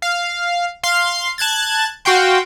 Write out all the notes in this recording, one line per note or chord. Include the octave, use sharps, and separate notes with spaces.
F5
F5 C6 C7
A5 F#6 G#6 A6
F#4 F5 G5 C6